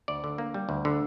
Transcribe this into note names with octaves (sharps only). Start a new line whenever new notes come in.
D2 D5
D3
A#3
G3
D2
D3